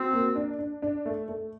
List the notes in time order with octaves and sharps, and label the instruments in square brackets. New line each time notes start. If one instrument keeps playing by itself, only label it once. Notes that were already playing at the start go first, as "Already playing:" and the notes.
Already playing: [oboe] C4 [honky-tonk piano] F#4
[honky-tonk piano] A#3
D4
D4
D4
A3
A3